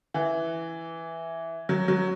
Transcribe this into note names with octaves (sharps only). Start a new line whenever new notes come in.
E3
F#3
F#3